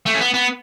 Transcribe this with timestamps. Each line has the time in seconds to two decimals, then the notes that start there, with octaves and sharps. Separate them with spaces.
0.06 A3
0.14 C#4
0.20 B3
0.34 B3